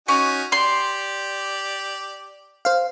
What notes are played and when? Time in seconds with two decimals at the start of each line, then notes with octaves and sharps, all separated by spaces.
0.08 C#4 D#4 F#4 G#5
0.52 G4 D5 C6
2.65 C5 F5